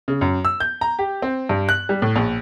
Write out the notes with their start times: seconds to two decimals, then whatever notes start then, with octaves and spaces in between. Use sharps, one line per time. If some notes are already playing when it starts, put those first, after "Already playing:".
0.08 C#3
0.21 F#2
0.45 E6
0.60 G6
0.81 A#5
0.99 G4
1.22 C4
1.49 G2
1.69 F#6
1.89 G3
2.02 A2
2.16 A#1